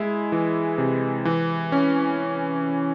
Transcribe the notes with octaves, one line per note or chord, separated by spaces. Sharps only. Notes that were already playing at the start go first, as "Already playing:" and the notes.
Already playing: G#3 E4
E3
C3
E3
C#4